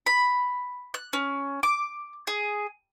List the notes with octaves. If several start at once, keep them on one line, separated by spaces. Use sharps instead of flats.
B5
F#6
C#4
D6
G#4